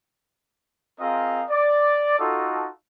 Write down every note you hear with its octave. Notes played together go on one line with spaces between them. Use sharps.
C4 F4 G#4 A#4 D#5 F5
D5
D#4 F4 F#4 A4